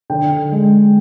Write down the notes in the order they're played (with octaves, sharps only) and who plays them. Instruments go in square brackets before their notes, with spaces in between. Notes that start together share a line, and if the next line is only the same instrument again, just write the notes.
[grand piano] D3 G5
G#3